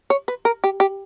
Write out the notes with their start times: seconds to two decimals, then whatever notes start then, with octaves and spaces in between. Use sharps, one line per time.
0.10 C#5
0.28 B4
0.45 A#4
0.64 G4
0.80 G4